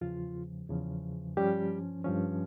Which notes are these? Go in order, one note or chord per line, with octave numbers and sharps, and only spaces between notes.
E2 C#3 F3 F4
E2 C#3 F3
G2 F3 G3 C#4 G4
G2 F3 C#4